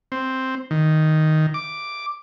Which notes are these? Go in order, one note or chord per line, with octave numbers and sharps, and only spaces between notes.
C4
D#3
D6